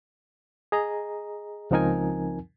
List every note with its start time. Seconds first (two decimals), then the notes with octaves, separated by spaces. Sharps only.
0.72 G#4 D#5 A#5
1.71 C#2 F3 C4 D#4 A#4 G#5